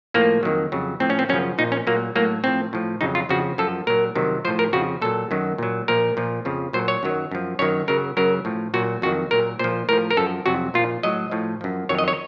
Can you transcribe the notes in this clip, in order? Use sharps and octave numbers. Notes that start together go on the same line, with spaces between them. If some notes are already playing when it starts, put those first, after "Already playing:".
A2 F3 A#3
F2 D#3 F#3
F2 C#3 F#3
A2 F3 C4
C#4
C4
F#2 C#3 F3 C#4
A#2 F3 D#4
C#4
A#2 F#3 A#3
A2 F#3 A#3
A2 F3 C4
A2 F3
F2 C#3 F#3 D#4
F4
F2 C#3 F3 F#4
F#2 F3 A4
A#2 F#3 A#4
F2 C3 D#3 F#3
A2 F3 C5
A#4
F2 C#3 F3 F#4
A#2 F#3 A4
F#2 D#3 F#3
A#2 F#3
A#2 F3 A#4
A#2 F3
F2 C#3 F3
A#2 F#3 C5
C#5
F#2 D#3 F#3
F#2 F3
F#2 D#3 F#3 C#5
F#2 C#3 F#3 A#4
F#2 C#3 F#3 A#4
A2 F3
A#2 F#3 F#4
F2 D#3 F#3 F#4
A#2 F#3 A#4
A#2 F3 C5
A2 F3 A#4
A#4
F#2 F3 A4
F2 C3 F#3 F#4
A#2 F3 F4
A2 F#3 D#5
A2 F3
F#2 F3
F2 D#3 F#3 C#5
D#5
C#5